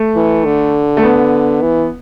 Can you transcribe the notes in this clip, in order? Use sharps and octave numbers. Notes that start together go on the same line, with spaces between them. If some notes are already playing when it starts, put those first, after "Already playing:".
Already playing: A3
E3
D3
A3
B3
E3